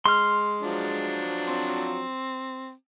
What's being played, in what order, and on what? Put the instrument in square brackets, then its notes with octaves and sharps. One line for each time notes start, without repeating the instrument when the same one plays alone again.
[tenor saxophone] G#3 [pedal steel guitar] C6 F6
[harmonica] F3 F#3 D4
[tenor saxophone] C4